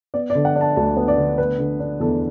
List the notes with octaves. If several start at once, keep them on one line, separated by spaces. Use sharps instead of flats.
B3 D5
D5
D3
F#5
D4
A5
D2 A5
B3
D5
D3
A3 B4
D3
D4
E2 A4